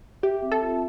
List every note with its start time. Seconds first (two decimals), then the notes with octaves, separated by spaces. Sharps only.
0.23 G4 E5
0.42 C4
0.52 A4
0.62 F4